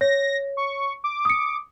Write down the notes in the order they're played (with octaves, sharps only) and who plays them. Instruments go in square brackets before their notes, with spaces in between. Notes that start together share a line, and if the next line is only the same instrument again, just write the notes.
[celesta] C#5 [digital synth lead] A#6
[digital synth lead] C#6
D6
[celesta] D#6 C#7